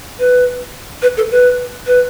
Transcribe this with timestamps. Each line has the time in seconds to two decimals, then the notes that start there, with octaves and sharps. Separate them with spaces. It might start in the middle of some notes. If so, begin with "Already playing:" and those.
0.19 B4
1.02 B4
1.17 A4
1.31 B4
1.87 B4